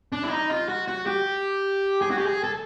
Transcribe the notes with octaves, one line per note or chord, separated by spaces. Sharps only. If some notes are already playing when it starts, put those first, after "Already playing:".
D4
E4
D#4
F4
F#4
F#4
G4
G#4
F#4
G4
G#4
A4